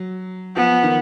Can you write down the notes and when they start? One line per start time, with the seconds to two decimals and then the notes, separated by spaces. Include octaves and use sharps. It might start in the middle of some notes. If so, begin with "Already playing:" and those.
Already playing: F#3
0.56 F3 B3
0.83 D#3